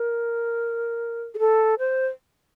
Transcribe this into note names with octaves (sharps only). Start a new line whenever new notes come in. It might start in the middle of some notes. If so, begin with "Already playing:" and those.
Already playing: A#4
G#4
A4
C5